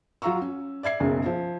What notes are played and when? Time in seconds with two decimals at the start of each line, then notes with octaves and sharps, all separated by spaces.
0.22 F#3 F4 F5 A#5 C#6 E6
0.41 C#4
0.83 D5 E5 G#6 C7
1.00 F#1 B1 F#2 C#3
1.26 F3